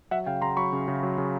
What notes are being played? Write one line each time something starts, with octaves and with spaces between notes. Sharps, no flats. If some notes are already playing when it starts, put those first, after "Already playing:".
F#3 E5 F#5
C#3 F5 G5
C#3 A#5 C6
F#3 B5 C#6
C#3
C#3
F#3
C#3